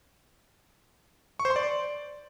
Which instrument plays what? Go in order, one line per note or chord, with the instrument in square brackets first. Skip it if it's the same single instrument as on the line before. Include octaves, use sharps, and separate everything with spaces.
[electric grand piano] C#6
C5
C6
D5